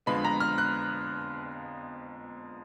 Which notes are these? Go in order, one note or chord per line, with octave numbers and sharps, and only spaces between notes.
F2 D3 F3 G#3 B3 B5
A#5
F6
F#6